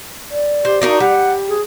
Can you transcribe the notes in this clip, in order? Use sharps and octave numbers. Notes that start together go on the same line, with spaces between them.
D5
G4 C5
D4 D#4 F#4 A#4
G3 F#5
G#4